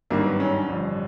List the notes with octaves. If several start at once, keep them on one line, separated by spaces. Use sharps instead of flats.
G#1 G2 D#3 F#3 A#3
B3
C#4
C#4
A1 G2 D3 F3